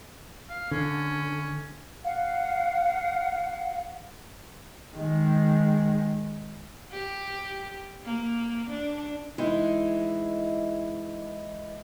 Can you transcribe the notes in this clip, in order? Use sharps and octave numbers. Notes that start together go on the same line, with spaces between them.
F5
D3 C#4
F5 F#5
D#3 G#3
G4
A#3
D4
E3 G#3 D#4 E4